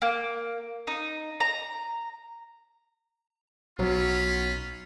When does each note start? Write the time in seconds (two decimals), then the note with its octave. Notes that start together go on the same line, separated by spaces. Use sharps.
0.02 A#3
0.87 D#4
1.40 A#5
3.79 B1 F#3 C#4 F4 B5